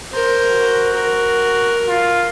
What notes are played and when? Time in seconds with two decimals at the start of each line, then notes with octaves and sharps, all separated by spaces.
0.12 A#4 C5
0.50 F#4
0.93 A#4
1.89 F4